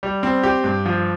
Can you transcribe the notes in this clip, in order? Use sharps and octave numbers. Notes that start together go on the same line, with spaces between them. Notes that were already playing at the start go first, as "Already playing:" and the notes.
G3
C4
G4
G2
F3